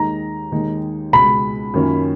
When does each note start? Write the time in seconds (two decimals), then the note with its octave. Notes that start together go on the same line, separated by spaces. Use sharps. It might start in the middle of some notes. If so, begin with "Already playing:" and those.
Already playing: D#2 D#3 G#3 D#4 A#5
0.52 D#2 D#3 G#3 D#4
1.13 C#2 B2 G#3 B5
1.74 F#2 D#3 A#3 C#4 F4